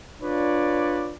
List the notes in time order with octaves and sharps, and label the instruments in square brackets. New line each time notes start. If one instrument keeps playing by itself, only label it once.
[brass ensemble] D4 F4 B4 C#5 D5